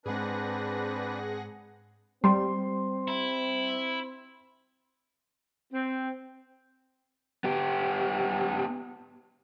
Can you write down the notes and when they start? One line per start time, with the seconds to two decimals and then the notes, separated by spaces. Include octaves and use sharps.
0.06 G#2 G#3 C4 D4 G#4 B4 F#5 A#6
2.24 G3 C4 C6
3.08 E4
5.73 C4
7.44 B3 G4